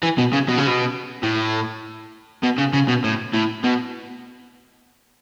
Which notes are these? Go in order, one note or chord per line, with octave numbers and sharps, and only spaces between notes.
E3
B2
C#3
B2
C#3
B2
A2
B2
C#3
C#3
B2
A2
A2
B2